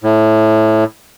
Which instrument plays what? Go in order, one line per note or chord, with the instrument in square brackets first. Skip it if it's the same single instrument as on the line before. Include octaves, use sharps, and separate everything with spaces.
[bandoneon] A2